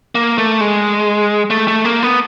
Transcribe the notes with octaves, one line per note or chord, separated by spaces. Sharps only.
A#3
A3
G#3
A3
A3
A#3
B3